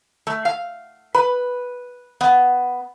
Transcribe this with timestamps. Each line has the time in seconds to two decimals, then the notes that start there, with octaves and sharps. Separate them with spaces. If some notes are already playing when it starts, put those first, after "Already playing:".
0.27 A3
0.45 F5
1.15 B4
2.21 B3